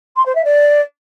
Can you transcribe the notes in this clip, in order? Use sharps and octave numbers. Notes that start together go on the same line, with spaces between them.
C6
C5
E5
D5